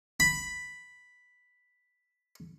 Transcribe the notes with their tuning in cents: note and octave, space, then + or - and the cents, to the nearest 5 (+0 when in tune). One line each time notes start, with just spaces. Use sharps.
B5 +0